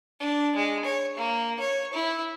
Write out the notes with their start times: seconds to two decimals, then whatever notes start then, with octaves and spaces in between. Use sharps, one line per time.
0.20 D4
0.56 G#3
0.85 C#5
1.17 A#3
1.60 C#5
1.93 E4